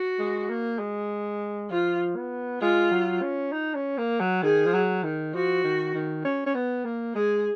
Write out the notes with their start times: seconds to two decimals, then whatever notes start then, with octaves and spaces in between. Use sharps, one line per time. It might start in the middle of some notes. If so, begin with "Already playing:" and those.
Already playing: F#4
0.19 G#3
0.50 A#3
0.79 G#3
1.70 F3 F4
2.16 B3
2.61 G#3 F4
2.91 F#3
3.22 C#4
3.52 D#4
3.75 C#4
3.98 A#3
4.20 F#3
4.43 D#3 G#4
4.66 F3
4.73 F#3
5.03 D#3
5.34 F3 F#4
5.64 D#3
5.94 D#3
6.25 C#4
6.46 C#4
6.55 B3
6.85 A#3
7.15 G#3 G#4